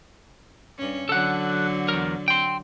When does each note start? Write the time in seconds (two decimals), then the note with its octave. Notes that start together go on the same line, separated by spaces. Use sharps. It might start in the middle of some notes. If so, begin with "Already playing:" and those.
0.78 G2 C#4
1.09 D3 F#3 A4 F#5
1.88 E2 A#4
2.28 G5 C6